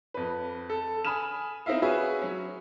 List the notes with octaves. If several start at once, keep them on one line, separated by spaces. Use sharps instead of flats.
F2 B4
A4
G#5 B5 D#6 F6 E7
C4 D#4 E4 E5 F5
C#4 F#4 G#4 B4 E5
F#3 C#4